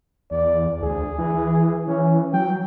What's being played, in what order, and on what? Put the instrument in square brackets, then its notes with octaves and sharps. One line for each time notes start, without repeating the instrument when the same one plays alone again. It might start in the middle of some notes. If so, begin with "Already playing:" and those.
[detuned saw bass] E2 [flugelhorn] D5
[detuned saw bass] D2 [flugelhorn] G#4
[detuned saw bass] E3
[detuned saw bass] E3 [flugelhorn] C#4
[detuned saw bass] F#3 [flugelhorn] G5